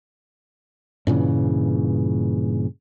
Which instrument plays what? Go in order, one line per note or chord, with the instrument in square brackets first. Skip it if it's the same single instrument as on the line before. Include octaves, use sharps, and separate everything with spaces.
[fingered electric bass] G2 A#2 C#3 E3